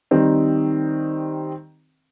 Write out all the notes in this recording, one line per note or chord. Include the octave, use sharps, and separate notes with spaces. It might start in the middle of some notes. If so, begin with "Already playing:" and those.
D#3 G3 C4 D#4